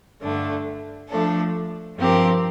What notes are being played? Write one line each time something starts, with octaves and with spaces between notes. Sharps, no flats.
G2 D3 A3 D4
F3 A3 D4 A4
G2 F3 C4 G4 A#4